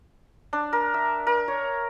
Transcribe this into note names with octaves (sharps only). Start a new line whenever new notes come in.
D4
A#4
E5
A#4
C#5